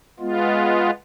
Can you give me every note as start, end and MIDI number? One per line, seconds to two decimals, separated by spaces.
0.20 0.91 56
0.20 0.91 59
0.20 0.91 65